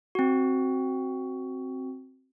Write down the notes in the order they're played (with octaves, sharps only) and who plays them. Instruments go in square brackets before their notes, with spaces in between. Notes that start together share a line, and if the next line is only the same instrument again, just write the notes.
[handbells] C4 F#4